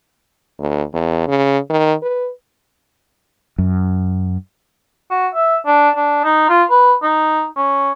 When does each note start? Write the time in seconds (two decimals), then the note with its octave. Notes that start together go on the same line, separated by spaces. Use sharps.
0.59 D2
0.94 E2
1.28 C#3
1.70 D#3
2.03 B4
3.58 F#2
5.10 F#4
5.34 E5
5.66 D4
5.96 D4
6.24 D#4
6.49 F4
6.70 B4
7.03 D#4
7.57 C#4